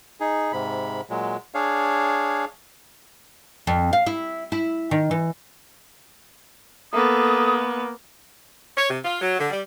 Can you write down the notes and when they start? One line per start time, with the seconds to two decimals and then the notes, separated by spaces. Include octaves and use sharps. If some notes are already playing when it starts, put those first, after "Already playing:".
0.20 D#4 G#4
0.53 G#2 C3 B5
1.10 A#2 F#3 G#3
1.55 D4 G#4 C#5 F5
3.67 F2
3.93 F5
4.06 E4
4.52 E4
4.91 D#3
5.11 E3
6.93 A#3 B3 A4 D#6
8.76 C#5
8.89 C3
9.04 F4
9.20 F#3
9.38 D3
9.50 G3